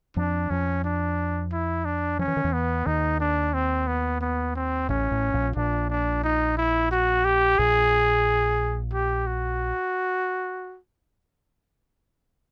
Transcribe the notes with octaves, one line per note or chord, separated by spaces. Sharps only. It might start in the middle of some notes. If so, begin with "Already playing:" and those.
F2 F3 D4
F2 F3 C#4
D4
E4
D4
F3 C#4
E3
D#3
E2 E3
B3
D#2 D#3 D#4
D4
C4
B3
B3
C4
A1 A2 C#4
A1 A2
A#1 A#2
A#1 A#2 D4
D4
D#4
E4
F#4
G4
A#1 A#2 G#4
G4
F#4